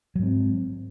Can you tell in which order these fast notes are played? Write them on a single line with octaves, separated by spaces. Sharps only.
F#3 G#2 C4